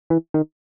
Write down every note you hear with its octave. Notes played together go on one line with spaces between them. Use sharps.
E3
D#3